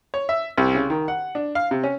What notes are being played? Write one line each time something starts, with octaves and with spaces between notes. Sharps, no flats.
C#5
E5
C2
C#3
D#3
F#5
D4
F5
C3
C#4